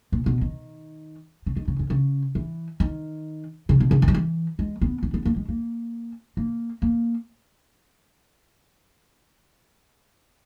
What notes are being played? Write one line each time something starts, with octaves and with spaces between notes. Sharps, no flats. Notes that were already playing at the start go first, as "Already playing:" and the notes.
A#2
B2
D#3
C#3
D#3
C#3
C#3
C#3
E3
D#3
C#3
B2
C#3
D#3
G3
E3
G#3
B3
B3
B3
A#3
G#3
A#3
A#3
A#3